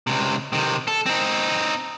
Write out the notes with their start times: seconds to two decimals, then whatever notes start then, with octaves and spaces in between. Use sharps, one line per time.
0.07 C#2 C3
0.53 C3 D#3
0.88 A4
1.06 C4 D#4